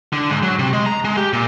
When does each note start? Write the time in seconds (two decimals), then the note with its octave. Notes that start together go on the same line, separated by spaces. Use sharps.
0.13 D3
0.30 G#2
0.43 F#3
0.59 C3
0.73 G#3
0.86 A#5
1.04 G#3
1.17 G4
1.33 A#2